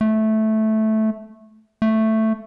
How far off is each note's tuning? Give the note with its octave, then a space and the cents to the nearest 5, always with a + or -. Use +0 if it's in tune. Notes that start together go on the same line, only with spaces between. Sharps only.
A3 -10
A3 +5